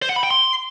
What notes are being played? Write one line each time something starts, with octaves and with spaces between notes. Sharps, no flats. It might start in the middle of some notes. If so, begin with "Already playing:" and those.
C5
F#5
B5
G5
C6